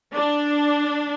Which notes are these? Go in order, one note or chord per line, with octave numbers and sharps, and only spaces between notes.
D4